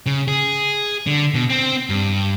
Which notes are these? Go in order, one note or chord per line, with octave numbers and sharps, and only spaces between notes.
C#3
G#4
D3
B2
C4
G2